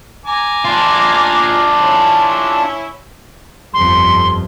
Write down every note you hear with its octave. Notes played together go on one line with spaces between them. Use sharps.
G#5 A#5 D6
D4 F4
C#4 E4
G1 F2 C6